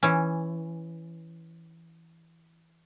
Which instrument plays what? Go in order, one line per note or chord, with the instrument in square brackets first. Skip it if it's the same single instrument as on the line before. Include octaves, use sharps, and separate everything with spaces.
[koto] E3 C#4